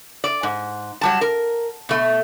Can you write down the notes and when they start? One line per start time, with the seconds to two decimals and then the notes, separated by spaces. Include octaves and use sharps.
0.24 D5
0.43 G#2
1.01 F#3 G3 A5
1.21 A#4
1.89 B2 A3